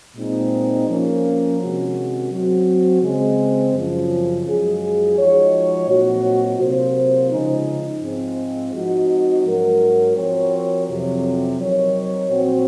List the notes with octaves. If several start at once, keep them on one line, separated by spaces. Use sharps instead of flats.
A#2 G#3 C4 D#4
F3 A#3 C#4
C3 D#3 G#3 C#4 F#4
F#3 C4 F#4
C#3 G#3 C4
F#2 C#3 F3
F#2 F3 G#3 C#4 G#4
F3 G#3 D#4 F#4 C#5
A#2 F#3 C4 D#4 F#4
C3 F#3 A#3 F4 C5
C#3 F3 G#3 D#4
G#2 F3 G#3 C4
F3 G#3 C4 D#4 F#4
G#2 F#3 C#4 F#4 A#4
F3 C4 F#4 A#4 C#5
F2 C3 F#3
F#3 C4 D#4 A#4 C#5
A#2 F3 C4 F#4